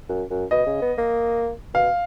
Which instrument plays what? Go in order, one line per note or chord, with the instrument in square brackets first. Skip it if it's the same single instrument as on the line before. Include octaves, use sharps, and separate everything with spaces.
[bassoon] F#2
F#2
[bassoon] B2 [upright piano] D#5
[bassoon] C#3
B3
A#3
[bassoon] B2 [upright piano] F5